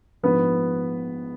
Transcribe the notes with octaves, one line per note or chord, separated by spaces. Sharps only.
A#1 G#2 F3 B3 B4